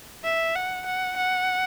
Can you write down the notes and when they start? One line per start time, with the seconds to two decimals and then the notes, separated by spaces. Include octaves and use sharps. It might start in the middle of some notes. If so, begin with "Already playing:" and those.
0.24 E5
0.56 F#5
0.86 F#5
1.17 F#5